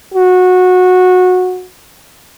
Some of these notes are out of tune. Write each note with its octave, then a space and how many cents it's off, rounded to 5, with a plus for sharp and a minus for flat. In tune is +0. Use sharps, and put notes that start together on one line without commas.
F#4 -20